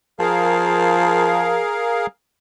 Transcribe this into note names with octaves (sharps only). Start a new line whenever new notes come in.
F3 G#4 A#4 F5